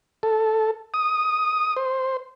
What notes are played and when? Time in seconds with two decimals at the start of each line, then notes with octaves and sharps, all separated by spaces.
0.23 A4
0.94 D#6
1.76 C5